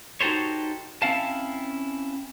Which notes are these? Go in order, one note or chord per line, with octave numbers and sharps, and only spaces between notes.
D#4 F#4 G4 A4 C5 C#5
C4 C#4 E4 F5 A5